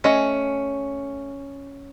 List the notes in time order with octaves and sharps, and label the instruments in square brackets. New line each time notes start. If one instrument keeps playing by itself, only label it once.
[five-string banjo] A3 D#5 G#5 [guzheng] C#4